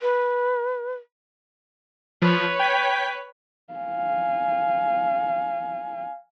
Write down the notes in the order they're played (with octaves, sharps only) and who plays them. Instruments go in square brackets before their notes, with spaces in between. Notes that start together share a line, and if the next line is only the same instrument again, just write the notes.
[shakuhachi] B4
[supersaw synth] F3 [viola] B4 C#5
[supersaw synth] G5 G#6 B6
[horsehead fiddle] F5 G#5